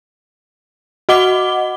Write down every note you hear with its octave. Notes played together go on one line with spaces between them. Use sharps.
F#4 D#5 F#5 D6 G7